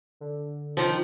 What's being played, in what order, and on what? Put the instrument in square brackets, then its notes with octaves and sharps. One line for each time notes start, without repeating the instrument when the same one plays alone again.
[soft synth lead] D3
[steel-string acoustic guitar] D#3 F3